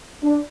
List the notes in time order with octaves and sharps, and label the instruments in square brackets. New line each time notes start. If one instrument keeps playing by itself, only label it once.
[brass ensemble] D4